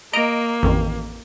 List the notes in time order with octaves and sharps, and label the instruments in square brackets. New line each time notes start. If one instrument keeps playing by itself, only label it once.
[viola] A#3 [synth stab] D#5 A#5 D7
[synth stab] A1 F2 D#3